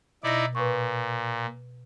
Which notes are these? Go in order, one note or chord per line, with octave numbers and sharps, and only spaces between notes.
B2 D#4 E4 D5 A#6
A#2 B4 C#6